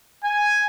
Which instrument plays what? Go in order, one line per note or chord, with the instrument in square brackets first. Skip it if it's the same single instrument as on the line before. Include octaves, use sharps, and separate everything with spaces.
[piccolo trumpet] G#5